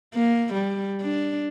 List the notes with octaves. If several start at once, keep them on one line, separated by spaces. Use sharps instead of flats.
A#3
G3
D4